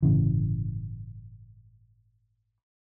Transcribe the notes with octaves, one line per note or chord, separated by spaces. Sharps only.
G1 A2 C#3 E3